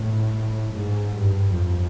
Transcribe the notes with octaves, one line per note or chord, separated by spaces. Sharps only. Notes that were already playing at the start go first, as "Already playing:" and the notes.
Already playing: A2
G#2
G2
F2